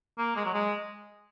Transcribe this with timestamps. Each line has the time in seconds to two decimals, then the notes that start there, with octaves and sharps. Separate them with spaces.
0.18 A#3
0.36 G#3
0.45 F#3
0.54 G#3